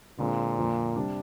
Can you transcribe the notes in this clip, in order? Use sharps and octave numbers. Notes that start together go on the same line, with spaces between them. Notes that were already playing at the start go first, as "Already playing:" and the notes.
A#2 D3 G#3 C4 F4
F2 D3 F3 A#3 F4
C3 G3 D4